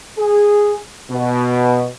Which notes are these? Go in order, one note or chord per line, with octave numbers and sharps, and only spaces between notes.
G#4
B2